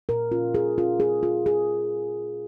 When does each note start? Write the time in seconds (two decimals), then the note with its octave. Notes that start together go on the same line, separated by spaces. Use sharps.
0.09 A#2 A#4
0.32 C#4 F4
0.55 A#2 G#4
0.77 C#4 F4
1.00 F4 G#4
1.23 F4
1.46 F4 G#4